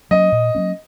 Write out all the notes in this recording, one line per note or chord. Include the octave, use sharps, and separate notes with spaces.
F#3 A#3 C#4 D#5
A#2
F#3 A#3 C#4